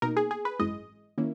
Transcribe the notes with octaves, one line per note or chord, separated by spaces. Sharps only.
B2 A#3 D#4 A#4
G#4
G#4
B4
G#1 F#2 E3 G#3 D#5
D#3 A#3 C#4 E4